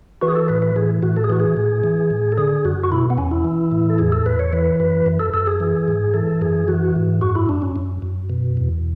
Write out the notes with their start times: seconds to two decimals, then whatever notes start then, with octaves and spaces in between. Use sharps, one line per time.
0.22 E3 F#4
0.28 G#4
0.35 A4
0.48 A2 B4
0.62 B4
0.76 E3 G#4
1.03 A2 F#4
1.16 A4
1.24 G#4
1.30 E3 F#4
1.40 G#4
1.57 A2
1.84 E3
2.10 A2
2.32 A4
2.37 D3 G#4
2.64 F#2 F#4
2.84 F#4
2.92 B2 E4
3.10 B3
3.18 E2 C#4
3.31 E4
3.44 E3
3.72 A2
3.89 A4
3.98 E2 G#4
4.12 A4
4.26 E2 B4
4.39 C#5
4.53 E3 B4
4.80 F#2 B4
5.06 F#2
5.20 A4
5.34 F#2 A4
5.47 G#4
5.60 E3
5.88 G#2
6.14 E3 A4
6.41 F#2 G#4
6.68 E3 F#4
6.96 G#2
7.21 F#2 F#4
7.35 E4
7.49 F#2 D4
7.62 C#4
7.76 F#2
8.02 F#2
8.30 B2
8.57 E2